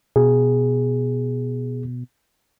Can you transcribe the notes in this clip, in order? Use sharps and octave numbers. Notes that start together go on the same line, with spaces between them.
B2 G#4